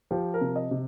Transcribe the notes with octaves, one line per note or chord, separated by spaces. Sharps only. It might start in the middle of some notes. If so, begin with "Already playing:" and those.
F3 G4
A#4
C3
D#5
C3